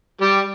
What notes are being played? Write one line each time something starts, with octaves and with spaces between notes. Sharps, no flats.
G3 G4